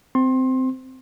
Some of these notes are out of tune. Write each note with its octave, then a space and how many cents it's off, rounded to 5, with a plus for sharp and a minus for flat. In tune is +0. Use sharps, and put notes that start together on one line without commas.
C4 -15 C6 +25